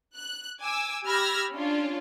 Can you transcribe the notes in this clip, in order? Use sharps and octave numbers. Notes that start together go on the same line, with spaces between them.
F#6
G#5 D6 E6
G4 B5 E6 F6 G#6 A#6
C#4 D4 F4